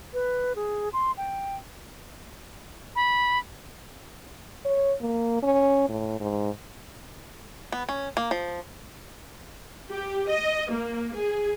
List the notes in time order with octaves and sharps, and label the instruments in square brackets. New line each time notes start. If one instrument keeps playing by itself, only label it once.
[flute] B4
G#4
C6
G5
[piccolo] B5
[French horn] C#5
A#3
C#4
A2
G#2
[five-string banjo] B3
C#4
A#3
F3
[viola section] G4
D#5
A#3
G#4